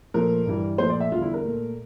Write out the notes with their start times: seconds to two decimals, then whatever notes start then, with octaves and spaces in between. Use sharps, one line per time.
0.14 A#2 F3 A3 A#4
0.46 G2 E3 G3
0.78 A#2 F3 A3 C5
0.90 D5
1.00 E5
1.12 E2 D3 G3 F4
1.22 E4
1.34 A#4
1.45 A#2 A3